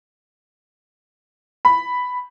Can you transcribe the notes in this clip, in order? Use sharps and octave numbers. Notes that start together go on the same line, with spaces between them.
B5